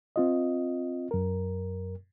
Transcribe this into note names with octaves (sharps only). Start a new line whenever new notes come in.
C4 F4 D#5
F#2 A#4